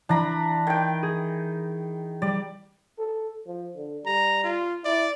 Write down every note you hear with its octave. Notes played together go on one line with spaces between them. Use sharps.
E3 D4 A#5 B5
D#3 G5
G#4
G3 D5
A4
F3
D3
G3 A#5
F4
E4 D5